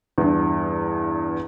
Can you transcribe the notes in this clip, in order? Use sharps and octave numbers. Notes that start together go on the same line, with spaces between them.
E2 G2